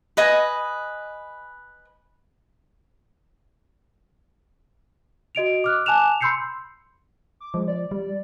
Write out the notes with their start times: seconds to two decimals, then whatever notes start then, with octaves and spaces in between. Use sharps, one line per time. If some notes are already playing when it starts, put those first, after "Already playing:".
0.17 B4 D#5 G#5 D#6
5.35 F#4 D#5 D7 F7
5.64 D6 F6 F#6
5.86 G#5 A5 D6 F#6 E7 F7
6.21 B5 C6 E6 G6 C7 C#7
7.40 D6
7.54 F3 G#3
7.68 D5
7.91 G3